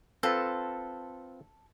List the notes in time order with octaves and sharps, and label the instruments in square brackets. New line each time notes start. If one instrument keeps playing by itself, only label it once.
[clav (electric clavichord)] C4 F4 B4 [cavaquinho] A4